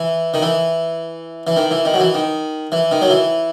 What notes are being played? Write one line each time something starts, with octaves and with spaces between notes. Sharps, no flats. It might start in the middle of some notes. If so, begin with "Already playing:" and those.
Already playing: E3
D#3
E3
E3
D#3
E3
D#3
F#3
E3
D#3
E3
D#3
F#3
E3